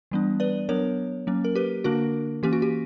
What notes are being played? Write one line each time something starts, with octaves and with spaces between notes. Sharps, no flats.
E3 G3 B3 D4
B4 D5
F#3 B3 D4 A#4 C#5
F#3 A#3 C#4
A#4
G4 B4
D3 A#3 D4 F#4 A#4
E3 A#3 C#4 G4
F#4
G4